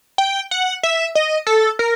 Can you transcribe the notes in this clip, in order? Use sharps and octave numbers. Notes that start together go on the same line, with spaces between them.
G5
F#5
E5
D#5
A4
A#4